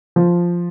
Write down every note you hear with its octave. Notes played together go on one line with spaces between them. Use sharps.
F3